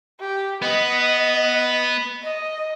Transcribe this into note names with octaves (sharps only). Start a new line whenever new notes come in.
G4
B3 D#5
D#5